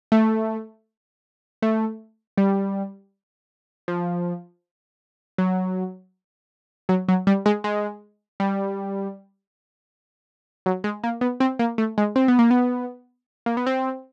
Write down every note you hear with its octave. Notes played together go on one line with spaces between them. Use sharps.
A3
A3
G3
F3
F#3
F#3
F#3
G3
G#3
G#3
G3
F#3
G#3
A#3
B3
C4
A#3
A3
G#3
C4
B3
A#3
B3
A#3
B3
C4